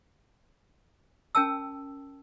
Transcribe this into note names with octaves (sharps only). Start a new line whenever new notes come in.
C#4 A#4 G5 A5 E6